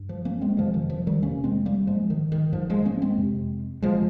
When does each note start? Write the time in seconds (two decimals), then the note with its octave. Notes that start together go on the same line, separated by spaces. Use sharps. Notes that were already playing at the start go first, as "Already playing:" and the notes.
Already playing: G2
0.09 F3
0.25 A#3 C#4
0.41 G#3 C4
0.57 F2 C3 F3 G#3
0.74 D#3
0.90 F3
1.07 D#3 G3
1.22 F2 C3 A#3 C#4
1.44 G#3 C4
1.65 G3 A#3
1.87 G#2 F3 G#3
2.10 D#3
2.32 D#3
2.53 G#2 F3
2.70 F3 G#3
2.85 A#3 C#4
3.02 G#3 C4
3.17 F2 C3
3.82 F2 C3 F3 G#3